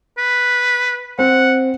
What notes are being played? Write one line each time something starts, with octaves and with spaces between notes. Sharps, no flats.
B4
C4 F#5